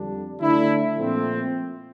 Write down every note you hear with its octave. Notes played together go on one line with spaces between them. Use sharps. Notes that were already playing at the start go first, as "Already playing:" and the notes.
Already playing: F2 D3 G3 D4
D3 A3 D4 E4
A#2 F3 A3 C4